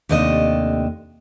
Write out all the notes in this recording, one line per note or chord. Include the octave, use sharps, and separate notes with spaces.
D#2 C3 A3 D4 D#5